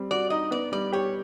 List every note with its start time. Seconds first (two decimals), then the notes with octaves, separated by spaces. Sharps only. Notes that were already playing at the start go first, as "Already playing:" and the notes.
Already playing: G3 C4
0.11 F#4 D5
0.30 D#4 D#5
0.51 B3 D5
0.72 G3 D5
0.92 G4 C#5